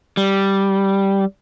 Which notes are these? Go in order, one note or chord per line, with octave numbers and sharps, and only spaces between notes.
G3